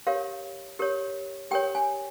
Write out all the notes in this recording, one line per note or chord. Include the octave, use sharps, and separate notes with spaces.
G4 A#4 C#5 F5
G4 A#4 C#5
G4 A#4 C#5 G5
G#5